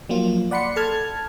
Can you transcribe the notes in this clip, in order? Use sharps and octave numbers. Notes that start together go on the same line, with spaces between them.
F3 F#3 A#3 F4
D5 F#5 B5 C6 C#7
A4 A5 F6 G#6